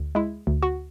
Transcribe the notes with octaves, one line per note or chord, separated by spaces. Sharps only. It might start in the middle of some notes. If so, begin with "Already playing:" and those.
Already playing: D2
G#3 E4
D2
F#4